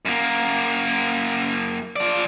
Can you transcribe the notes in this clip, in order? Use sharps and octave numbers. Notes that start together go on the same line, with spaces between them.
F#2 A#3
F3 D5